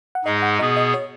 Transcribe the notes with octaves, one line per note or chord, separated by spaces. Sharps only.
F#5
G#2 G#3 D#4 G#4 D#5
F#5
B2 B3 G#4 D#5
D#5
C#5